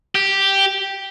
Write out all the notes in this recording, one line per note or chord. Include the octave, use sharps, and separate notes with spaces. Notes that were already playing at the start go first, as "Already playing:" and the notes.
G4